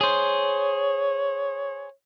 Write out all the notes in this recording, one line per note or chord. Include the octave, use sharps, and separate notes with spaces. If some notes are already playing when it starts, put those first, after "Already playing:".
G#4 C5 C#5